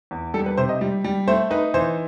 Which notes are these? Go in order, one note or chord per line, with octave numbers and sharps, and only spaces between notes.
E2
G3 A4
B4
C3 C5
D#5
G3
G3
A3 C5
D#4 B4
E3 C5